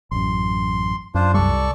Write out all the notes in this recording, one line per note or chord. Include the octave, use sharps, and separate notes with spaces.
A1 F#2 C6
F#2 D4 F4 C5
C2 G3 A4 D5 C#6